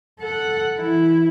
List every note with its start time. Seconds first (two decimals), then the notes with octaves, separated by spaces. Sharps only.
0.20 A4 F#5
0.75 E3 E4